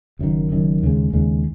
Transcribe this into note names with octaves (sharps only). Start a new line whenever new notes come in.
F#1 F#2 D#3
F#1 F#2 D#3
D#2 C#3 G#3
D#2 C#3 G#3